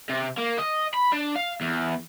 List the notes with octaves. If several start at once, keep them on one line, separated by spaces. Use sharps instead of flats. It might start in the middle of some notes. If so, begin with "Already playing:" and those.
C3
A#3
D#5
B5
D4
F5
E2